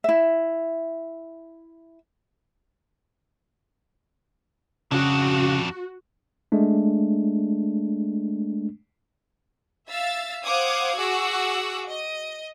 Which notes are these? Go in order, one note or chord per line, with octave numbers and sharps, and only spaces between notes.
E4 E5
F2 C#3 D4 F#4
G#3 A3 D4
E5 F5 E6 A6
C5 F5 F#5 D6 D#6 G#6
F#4 G#4 F#5 D6 E6
D#5